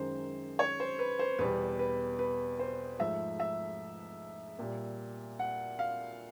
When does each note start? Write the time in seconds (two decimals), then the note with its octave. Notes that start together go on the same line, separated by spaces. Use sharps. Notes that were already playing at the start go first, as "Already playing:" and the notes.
Already playing: F#2 D#3 G#3 C5
0.59 C#5
0.80 C5
0.99 B4
1.19 C5
1.39 E2 B2 G3 B4
1.79 B4
2.19 B4
2.59 C5
2.99 G#2 F3 A3 E5
3.40 E5
4.59 A#2 G3
5.39 F#5
5.79 F5